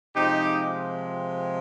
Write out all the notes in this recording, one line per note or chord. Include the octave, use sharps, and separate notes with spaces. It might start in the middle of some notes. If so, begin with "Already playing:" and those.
C3 F3 G#3 D#4 G4